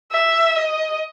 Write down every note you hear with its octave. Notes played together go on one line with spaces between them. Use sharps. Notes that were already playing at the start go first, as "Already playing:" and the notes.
E5
D#5